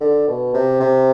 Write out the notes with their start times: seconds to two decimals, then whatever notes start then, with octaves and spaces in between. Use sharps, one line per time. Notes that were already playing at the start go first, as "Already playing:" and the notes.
0.01 D3
0.28 B2
0.54 C3
0.80 C3